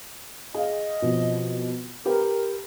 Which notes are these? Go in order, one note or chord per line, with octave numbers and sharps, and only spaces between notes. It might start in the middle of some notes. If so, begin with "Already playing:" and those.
G#4 D#5 F5
B2 F3 C4
G4 A#4 B4 G5